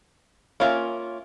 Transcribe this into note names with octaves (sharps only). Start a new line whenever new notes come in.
A#3 C#4 F4 A#4 E5